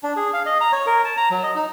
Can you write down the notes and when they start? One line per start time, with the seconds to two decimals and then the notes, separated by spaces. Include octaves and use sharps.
0.03 D4
0.16 G#4
0.33 F5
0.46 D#5
0.61 A#5
0.72 C#5
0.86 A#4
1.04 A5
1.17 A#5
1.31 F#3
1.43 D#5
1.56 D#4